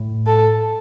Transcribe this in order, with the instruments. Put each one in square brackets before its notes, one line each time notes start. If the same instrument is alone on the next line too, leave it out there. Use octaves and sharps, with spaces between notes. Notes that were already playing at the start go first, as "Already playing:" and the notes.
Already playing: [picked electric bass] A2
[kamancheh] A4